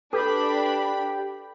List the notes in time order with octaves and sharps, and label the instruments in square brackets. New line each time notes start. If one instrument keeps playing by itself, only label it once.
[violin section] D4 B5 [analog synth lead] G4 [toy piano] A4 B4